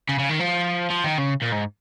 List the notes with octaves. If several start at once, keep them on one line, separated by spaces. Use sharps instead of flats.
C#3
C#3
D#3
F3
F3
D#3
C#3
A#2
G#2